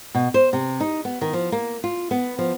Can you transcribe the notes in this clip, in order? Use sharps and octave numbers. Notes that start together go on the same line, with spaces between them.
B2
C5
C3
D#4
B3
D#3
F3
A#3
F4
B3
F3